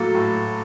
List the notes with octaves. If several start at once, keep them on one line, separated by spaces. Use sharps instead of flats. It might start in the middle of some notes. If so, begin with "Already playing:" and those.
Already playing: A2 F#3 A#3 A4
A2